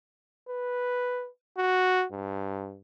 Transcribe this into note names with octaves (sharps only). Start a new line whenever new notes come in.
B4
F#4
G2